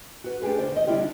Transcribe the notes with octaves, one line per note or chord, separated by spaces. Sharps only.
F#4 B4
A3 D4 G4 G#4 B4
D2 C5 D5
E2 D#5
D3 G3 C4 E4 F4 G4
D4 D#4